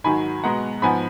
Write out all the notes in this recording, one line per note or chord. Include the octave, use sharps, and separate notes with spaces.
G#2 D#3 F#3 G#5 B5
B2 G#3 B3 F#5 A#5
G#2 F3 B3 G#5 B5